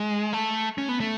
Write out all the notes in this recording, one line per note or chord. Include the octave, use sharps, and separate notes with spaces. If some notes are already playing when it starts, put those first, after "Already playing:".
Already playing: G#3
A3
C#4
B3
A3